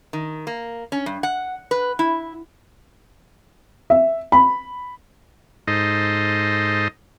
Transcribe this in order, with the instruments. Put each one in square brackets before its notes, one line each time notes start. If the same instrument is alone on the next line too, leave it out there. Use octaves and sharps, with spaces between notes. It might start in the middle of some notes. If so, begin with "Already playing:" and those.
[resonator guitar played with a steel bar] D#3
A#3
C#4
G2
F#5
B4
E4
[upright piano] E5
B5
[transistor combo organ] G#2 D#4 A4 C5 D#5